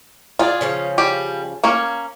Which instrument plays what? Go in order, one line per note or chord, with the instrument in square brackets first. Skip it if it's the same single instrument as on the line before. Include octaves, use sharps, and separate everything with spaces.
[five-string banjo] F4 G#4 [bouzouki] D5
[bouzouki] C#3 F3 C#4
[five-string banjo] G3 G4
A#3 C#4 C#5